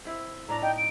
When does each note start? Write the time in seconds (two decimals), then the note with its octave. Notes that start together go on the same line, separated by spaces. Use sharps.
0.05 C4 E4
0.49 A2 D4 A#5
0.62 D#4 G5
0.77 D7